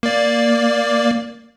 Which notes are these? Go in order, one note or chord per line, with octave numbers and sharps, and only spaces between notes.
A#3 D5